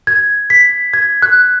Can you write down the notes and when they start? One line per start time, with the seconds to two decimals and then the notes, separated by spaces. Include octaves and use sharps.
0.07 G#6
0.50 B6
0.94 G#6
1.22 F#6